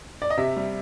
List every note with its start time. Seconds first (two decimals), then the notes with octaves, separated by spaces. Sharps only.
0.22 D5
0.30 D#5
0.37 C3 E5
0.57 G3